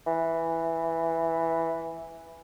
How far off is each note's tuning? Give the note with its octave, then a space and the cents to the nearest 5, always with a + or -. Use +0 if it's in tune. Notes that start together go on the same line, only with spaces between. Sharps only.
E3 +0